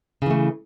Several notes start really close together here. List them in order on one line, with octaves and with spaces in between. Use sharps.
C#3 E3 A3